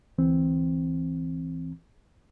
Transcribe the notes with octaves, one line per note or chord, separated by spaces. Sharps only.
D2 E3 C4